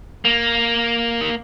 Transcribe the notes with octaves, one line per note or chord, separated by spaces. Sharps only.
A#3
D#3